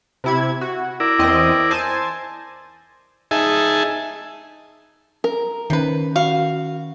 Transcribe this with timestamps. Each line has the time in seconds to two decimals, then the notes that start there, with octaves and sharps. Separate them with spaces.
0.24 C3 E4 G#6
0.61 F#4
1.00 E4 A#4 D5
1.19 E2 C4 D#5
1.71 C5 G#5 A5
3.31 D#4 G#4 E5 G#5 A5
5.24 A#4
5.70 C3 D#3 C#4 B4
6.16 F#4 F5